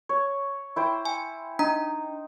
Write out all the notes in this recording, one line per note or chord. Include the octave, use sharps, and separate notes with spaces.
C#5
E4 C5 G5
G#5
D4 D#4 A#5